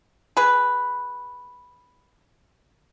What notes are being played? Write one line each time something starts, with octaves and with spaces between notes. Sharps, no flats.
G#4 B4